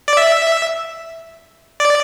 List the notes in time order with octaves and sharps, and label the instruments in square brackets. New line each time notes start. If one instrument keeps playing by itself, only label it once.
[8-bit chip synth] D5
E5
D5